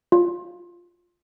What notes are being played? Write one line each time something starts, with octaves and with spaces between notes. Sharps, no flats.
F4